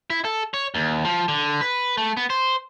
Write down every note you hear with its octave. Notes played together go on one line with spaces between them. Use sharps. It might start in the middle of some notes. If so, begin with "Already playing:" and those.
E4
A4
C#5
D#2
F3
D3
B4
A3
B3
C5